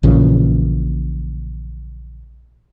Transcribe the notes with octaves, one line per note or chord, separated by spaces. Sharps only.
A#1 A#2 C#3 E3